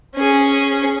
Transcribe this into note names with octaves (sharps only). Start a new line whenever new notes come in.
C#4 G#4